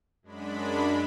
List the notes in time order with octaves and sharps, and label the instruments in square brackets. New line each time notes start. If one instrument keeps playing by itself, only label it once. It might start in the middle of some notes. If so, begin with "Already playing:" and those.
[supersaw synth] F#2 G#3 D4 B5